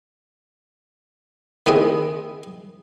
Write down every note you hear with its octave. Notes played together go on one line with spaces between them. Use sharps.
D#3 B3 C4 E4 G#4 D#5